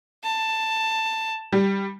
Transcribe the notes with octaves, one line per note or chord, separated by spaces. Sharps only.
A5
G3